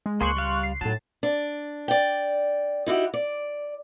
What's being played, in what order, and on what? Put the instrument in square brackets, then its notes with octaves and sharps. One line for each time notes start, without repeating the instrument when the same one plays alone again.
[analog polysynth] G#3
[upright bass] C#2 [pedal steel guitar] A#3 G#4 C5 [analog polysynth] C6 C#6 F#6
[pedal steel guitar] G3 F5
[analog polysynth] C7
[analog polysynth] A2 A5 [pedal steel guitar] F#3 [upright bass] D#4
[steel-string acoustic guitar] D4
D5 G5
D#4 E4 F#4 G4
D5